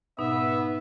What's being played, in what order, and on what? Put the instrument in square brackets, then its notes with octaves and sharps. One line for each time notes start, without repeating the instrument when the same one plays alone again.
[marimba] G#2 B2 D#4 [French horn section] B3 [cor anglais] E5